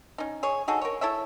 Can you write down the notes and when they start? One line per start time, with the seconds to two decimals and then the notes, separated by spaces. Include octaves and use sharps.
0.18 C#4 D#4
0.43 G#4 C#5
0.68 D#4 F#4 G#4 A4
0.82 A#4 C#5
1.01 E4 A4 C#5 E5